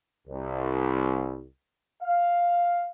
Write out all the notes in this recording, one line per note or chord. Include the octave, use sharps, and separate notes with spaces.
C2
F5